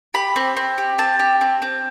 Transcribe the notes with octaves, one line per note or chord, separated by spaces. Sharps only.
G4 B5
C4
C4
G4
C4 A5
G4
C4
C4